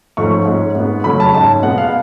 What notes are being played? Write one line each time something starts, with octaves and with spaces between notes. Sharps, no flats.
G#2 F3 A3 C#4 C#6
G#2 G#3 C#4
G#2 G#3 B3
C#3 F#3 A3 C#4 B5
A5
G#2 G#3 C#4 A5
B2 G#3 B3 F#5
F5